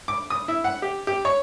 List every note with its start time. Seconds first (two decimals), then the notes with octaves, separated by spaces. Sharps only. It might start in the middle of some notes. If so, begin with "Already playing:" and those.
0.08 D6
0.30 D#6
0.48 E4
0.64 F#5
0.82 G4
1.07 G4
1.25 C#5